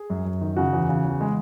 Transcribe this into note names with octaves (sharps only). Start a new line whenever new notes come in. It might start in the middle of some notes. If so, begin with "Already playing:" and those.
Already playing: G#4
F#2
F#2
D#3
C#3 F#4
E2
C#3
E2
G#3